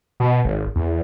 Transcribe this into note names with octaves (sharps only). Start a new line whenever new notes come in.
B2
G#1
E2